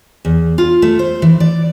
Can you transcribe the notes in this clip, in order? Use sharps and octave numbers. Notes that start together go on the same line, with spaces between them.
E2
F4
A3
C5
E3
D5